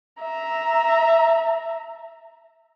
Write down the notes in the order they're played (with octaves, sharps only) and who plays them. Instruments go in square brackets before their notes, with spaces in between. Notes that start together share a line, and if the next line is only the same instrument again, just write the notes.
[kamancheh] E5 A#5